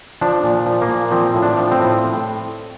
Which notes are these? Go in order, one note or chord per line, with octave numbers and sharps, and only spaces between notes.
F3 D4
A#2
F3
A#3
A#2
F3 C4
A2
D4
F3
C4
A2